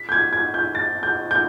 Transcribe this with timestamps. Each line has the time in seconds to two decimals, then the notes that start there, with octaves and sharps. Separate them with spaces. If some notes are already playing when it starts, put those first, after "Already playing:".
Already playing: B6
0.09 G6
0.12 G#6
0.33 G#6
0.54 G6
0.75 A6
1.03 G6
1.31 G6